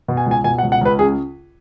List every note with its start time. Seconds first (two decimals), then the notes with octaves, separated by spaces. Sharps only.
0.08 B2
0.17 G#5
0.26 C#2
0.31 G#5
0.44 B2 G#5
0.58 F#5
0.63 C#2
0.72 F#5
0.81 C#2 B4
0.99 C#3 G#4